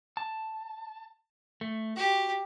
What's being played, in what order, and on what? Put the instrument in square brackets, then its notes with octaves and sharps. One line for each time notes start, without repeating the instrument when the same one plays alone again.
[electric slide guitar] A5
A3
[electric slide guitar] F#4 [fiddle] G4